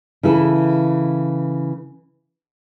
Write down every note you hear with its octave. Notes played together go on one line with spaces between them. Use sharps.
C#3 E3 E4 A4